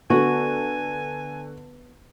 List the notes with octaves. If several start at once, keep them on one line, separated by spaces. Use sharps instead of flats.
D3 B3 F#4 G#5